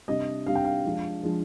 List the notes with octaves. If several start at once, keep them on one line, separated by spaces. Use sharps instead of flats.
C3 G3 D4 D#5
C3 G3 D4 F5
G5
F5
F3 G#3 D4
F3 G#3 D4